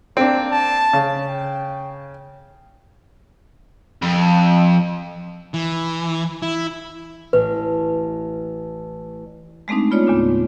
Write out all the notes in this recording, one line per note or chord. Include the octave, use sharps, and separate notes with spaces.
A#3 C4 D4
A5
C#3
G5
F2
E3
E4
A1 B4
G#3 A3 C4 D4 D#4
B3 F4 C#5 D5
E2 A#2 D3